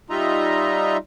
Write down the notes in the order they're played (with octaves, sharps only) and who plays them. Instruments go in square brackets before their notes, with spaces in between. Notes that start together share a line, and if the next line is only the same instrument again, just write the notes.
[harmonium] G3 D#4 F4 D#5 E5 A#5